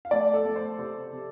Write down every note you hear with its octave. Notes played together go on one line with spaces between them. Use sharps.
F5
A3 D5
A4
A3
C5
C3 C5
C3